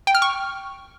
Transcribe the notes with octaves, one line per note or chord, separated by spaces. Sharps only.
G5
F6
C#6